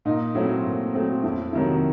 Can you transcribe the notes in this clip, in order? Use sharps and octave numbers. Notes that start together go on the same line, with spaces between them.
A#2 D#4
F#3 A3 C4 E4
A#2
F#3 A3 C4
F2 E4
C3 D#3 F#3 E4